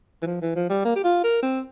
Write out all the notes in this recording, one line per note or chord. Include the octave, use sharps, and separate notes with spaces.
E3
F3
E3
F3
G3
A#3
G4
F4
A#4
C4